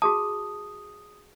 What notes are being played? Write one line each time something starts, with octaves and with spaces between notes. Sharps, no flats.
F#4 G#4 A5 D#6